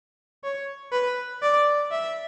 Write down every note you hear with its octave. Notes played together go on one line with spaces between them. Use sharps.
C#5
B4
D5
E5